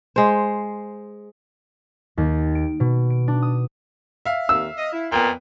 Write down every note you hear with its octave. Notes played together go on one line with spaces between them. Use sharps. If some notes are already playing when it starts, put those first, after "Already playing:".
G#3 C5
D#2
D7
B2
D7
D4
D#6
E5 F5
D#2 E6
D#5
E4
F2 A#2 B3 G5